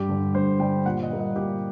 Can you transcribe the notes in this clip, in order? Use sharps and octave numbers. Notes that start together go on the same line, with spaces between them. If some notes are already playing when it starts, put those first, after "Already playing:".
Already playing: G2 G4
D3 G3
G2 C5
D3 G3 G5
A#2 F#5
D#5
G3 A#3
D#5
A#2 G4